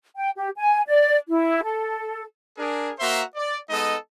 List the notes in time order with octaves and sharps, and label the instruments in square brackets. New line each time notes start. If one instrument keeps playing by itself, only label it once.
[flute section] G5
G4
G#5
D5
E4
A4
[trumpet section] D4 G#4 A#4
A#3 F#4 C5 E5 A#5 C6
D5
G#3 B3 D#4 A4 D#5